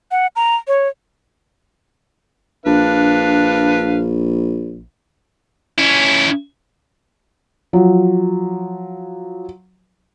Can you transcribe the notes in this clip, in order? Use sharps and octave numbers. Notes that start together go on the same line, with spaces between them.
F#5
A#5
C#5
A#1 D4 B4 F5
C#4 E4
F3 F#3